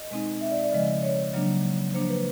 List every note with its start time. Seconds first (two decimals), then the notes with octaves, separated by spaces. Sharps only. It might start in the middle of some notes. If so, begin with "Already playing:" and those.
Already playing: D#5
0.10 B2 G#3 C4 D#4
0.41 E5
0.51 D5
0.62 D5
0.71 C#3 F3 G#3 D#5
1.02 C#5
1.33 C#3 F#3 A#3 D4
1.94 F3 A#3 D4 C5
2.09 B4